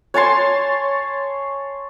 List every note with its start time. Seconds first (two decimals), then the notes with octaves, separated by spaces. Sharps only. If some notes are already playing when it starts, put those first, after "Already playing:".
0.14 C#5 G#5 A5 C6